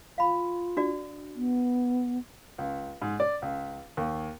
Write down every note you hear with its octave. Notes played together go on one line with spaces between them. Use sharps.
F4 F5 B5
D4 F#4 D5
B3
C#2
G#2
D5
C#2
D#2